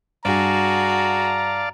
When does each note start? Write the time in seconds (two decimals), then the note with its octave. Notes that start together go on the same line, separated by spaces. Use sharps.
0.25 G2 F#4 G#4 D5 F5 A5 A#5